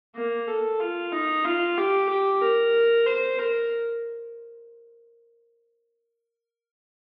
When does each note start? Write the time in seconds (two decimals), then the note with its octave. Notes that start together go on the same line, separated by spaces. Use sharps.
0.15 A#3
0.48 A4
0.80 F4
1.12 D#4
1.45 F4
1.77 G4
2.09 G4
2.42 A#4
3.06 C5
3.38 A#4